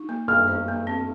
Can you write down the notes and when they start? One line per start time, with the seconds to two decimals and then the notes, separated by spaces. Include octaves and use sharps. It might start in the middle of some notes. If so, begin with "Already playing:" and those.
Already playing: D#4
0.09 A#3
0.28 A#3 F6
0.48 C5
0.68 A#3
0.87 C4